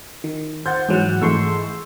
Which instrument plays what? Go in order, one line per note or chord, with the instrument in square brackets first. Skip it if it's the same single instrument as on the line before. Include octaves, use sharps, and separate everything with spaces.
[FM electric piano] D#3
[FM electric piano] C5 F#5 [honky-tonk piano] G6 A6
[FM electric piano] G#2 F#3 F#5 [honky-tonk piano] E3
[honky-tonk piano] G#2 E3 A3 [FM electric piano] C6 C#6 E6